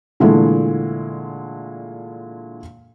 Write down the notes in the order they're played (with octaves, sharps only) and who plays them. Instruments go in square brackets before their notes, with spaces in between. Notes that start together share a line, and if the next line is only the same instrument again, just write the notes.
[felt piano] A#2 D3 E3 G#3 A3